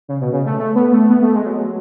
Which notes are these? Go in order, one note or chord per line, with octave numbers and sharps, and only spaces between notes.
C#3
B2
C#3
A3
A3
B3
A3
B3
A3
G#3
F#3